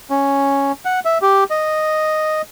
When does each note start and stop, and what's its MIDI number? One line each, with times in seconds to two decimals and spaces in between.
0.10 0.72 61
0.85 1.00 78
1.05 1.18 76
1.22 1.44 67
1.50 2.42 75